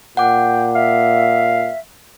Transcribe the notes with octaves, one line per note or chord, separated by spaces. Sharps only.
A#2 F#5 G5 D6
E5 F5